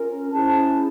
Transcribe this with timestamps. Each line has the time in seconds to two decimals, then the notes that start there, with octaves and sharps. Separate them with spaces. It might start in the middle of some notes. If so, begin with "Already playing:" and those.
Already playing: C#4 F4 A#4
0.33 C#4 E4 G#4 C5 A5